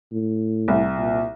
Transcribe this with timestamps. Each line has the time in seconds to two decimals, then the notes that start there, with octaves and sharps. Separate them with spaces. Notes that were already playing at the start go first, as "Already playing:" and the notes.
0.12 A2
0.68 C2
0.98 A#2